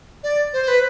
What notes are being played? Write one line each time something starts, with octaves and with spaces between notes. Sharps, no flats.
D5
C5
B4